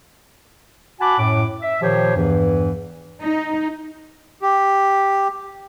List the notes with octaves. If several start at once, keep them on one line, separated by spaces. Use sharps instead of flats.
F#4 F#5 G#5 A5 B5 D6
F#2 A2 D6
E5
A#2 D#3 F3 G4 C5 C#5
E2 G2 E3
D#4
G4